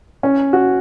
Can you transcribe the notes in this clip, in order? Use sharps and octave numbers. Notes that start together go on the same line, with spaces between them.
C#4
F#4